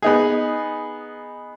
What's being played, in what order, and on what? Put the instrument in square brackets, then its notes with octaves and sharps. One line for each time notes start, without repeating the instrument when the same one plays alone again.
[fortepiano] B3 D#4 G#4